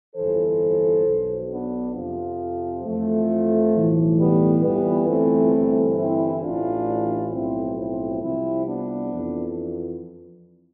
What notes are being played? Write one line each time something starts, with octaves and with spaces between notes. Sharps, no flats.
G1 F2 E3 A4 C5
B1 B2
B3 D4
F2 C3 F3
F2 E3 F3 A3
B1 A2 E3
G3 B3
G1 F2 E3 G3 B3
A3 C4
G1 G2 E3
C4 E4
A1 A2 E3 D4 F4
B1 A2 F3 C4 E4
C4 E4
C2 C3 F3 C4 E4
B3 D4
F2 E3